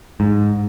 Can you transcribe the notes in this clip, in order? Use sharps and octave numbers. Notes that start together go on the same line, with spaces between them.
G#2